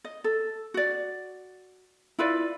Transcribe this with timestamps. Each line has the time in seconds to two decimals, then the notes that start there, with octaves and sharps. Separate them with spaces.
0.04 D#5
0.24 A4
0.74 F#4 D5
2.19 E4 F4 B4 D5